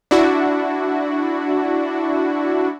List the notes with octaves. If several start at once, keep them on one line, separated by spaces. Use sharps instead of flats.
D4 E4 F#4